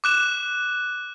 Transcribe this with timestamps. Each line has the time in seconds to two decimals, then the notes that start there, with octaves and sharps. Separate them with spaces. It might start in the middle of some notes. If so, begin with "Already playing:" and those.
0.04 D6 F#6 E7